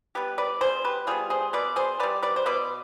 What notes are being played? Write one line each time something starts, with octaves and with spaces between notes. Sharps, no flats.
G3 B3 G4 B4
B4 D5
B2 G#4 C5
G4 B4
G3 B3 F4 G#4
G#4 C5
B2 B4 D5
G#4 C5
G3 B3 B4 D5
B4 D5
C5
B2 B4 D5